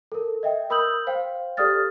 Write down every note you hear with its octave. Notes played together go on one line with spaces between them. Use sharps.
A4 A#4
D#5 E5 G5
A#4 B5 D#6 E6 G6 F#7
C5 F5 G5
G4 A4 D5 D#6 F6 A6